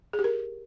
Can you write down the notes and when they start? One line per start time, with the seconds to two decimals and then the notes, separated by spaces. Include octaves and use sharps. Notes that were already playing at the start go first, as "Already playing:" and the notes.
0.13 G#4
0.19 G4
0.24 A#4